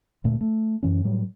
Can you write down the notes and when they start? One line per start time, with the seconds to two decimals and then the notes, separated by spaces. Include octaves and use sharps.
0.24 D2 A#2 A3
0.41 A3
0.83 F#2 E3 C#4
1.04 A2 F#3 G3